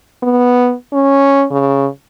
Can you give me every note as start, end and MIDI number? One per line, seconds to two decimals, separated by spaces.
0.23 0.74 59
0.93 1.45 61
1.51 1.87 49